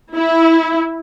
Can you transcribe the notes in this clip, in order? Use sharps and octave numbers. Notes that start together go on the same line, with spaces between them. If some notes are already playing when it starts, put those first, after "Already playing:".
E4